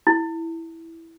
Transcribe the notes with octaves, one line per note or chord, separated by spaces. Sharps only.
E4